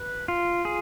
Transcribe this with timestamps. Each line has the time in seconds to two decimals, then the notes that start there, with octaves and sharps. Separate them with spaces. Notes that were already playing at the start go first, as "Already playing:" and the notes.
Already playing: B4
0.28 F4
0.65 G#4